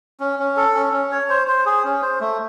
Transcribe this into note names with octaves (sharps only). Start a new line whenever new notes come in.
C#4
C#4
A4
C#4
C#4
C#5
C5
C5
G#4
C#4
C5
A3